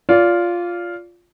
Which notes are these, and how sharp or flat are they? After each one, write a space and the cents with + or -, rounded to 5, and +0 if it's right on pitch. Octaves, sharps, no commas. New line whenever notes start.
F4 +0 D5 -30